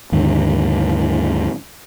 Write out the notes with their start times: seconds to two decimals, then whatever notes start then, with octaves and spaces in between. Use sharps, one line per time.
0.12 D#2 G#2 D3